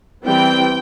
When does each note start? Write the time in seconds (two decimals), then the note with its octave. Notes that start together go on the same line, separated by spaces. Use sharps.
0.25 E3 G3 C4 G5